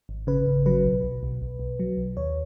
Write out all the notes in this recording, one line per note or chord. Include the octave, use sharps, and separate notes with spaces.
G#1
C#3 B4
G#1
F#3 B4
B1
B1
B1
B1
B1
F#3
B1
D#2 C#5